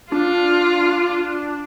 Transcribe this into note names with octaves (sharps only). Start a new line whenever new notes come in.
D4 F4